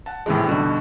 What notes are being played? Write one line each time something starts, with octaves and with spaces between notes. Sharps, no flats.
F#5 A5
A2 C3 D#3 E3 G#3
G2 B2 D3 D#4